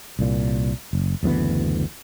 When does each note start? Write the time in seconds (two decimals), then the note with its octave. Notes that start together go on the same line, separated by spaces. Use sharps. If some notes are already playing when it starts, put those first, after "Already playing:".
0.19 C2 A#2
0.93 F#1
1.23 F#1 D2 E3 B3